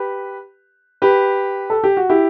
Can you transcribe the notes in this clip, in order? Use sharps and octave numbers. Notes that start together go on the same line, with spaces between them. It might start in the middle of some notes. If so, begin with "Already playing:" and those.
Already playing: G4 B4
G4 B4
A4
G4
F#4
E4 G4